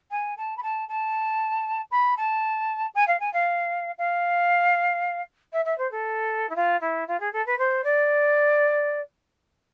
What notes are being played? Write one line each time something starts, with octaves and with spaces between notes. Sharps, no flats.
G#5
A5
B5
A5
A5
B5
A5
G#5
F5
G#5
F5
F5
E5
E5
C5
A4
E4
F4
E4
F4
G#4
A4
B4
C5
D5